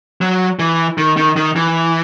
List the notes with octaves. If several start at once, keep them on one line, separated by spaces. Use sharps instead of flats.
F#3
E3
D#3
D#3
D#3
E3